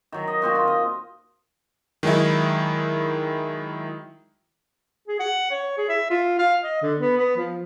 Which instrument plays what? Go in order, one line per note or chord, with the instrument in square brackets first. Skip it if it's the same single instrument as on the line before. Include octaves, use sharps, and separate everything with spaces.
[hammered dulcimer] D#3 F#3
D#5
A#2 C4 F#4
F4
D#5
[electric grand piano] D#3 F#3 G#3 D#4 E4
[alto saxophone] G#4
F#5
C#5
G#4
E5
F4
F5
D#5
D3
B3
B3
F3